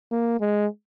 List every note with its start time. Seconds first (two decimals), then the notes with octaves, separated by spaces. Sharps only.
0.12 A#3
0.40 G#3